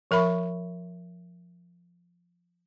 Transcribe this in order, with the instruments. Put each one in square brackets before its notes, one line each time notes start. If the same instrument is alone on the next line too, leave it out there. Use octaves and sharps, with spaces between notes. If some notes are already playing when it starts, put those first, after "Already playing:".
[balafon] F3 A#4 E5 B5 C#6